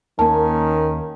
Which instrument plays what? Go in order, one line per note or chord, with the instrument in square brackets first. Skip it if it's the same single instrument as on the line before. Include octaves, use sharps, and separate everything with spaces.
[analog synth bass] D#2 [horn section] D#3 C#4 [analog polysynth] A#3 A#4 [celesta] A5